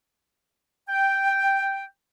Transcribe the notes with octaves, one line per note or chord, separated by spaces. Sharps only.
G5